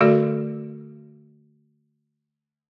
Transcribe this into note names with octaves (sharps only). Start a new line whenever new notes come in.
D3 A3 F#4 A4 D5